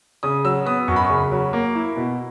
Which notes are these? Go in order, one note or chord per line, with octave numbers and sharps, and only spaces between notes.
C#3 D#6
F#3 E6
B3 D#6
F#2 C#6
B5
C#6
C#3
F#3
A#3
E4
B2